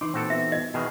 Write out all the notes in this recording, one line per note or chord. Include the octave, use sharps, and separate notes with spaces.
E3 D#4 C6 D6
A#2 C4 F#4 A4
B3 E5
D#5
B2 D#3 E3 G#4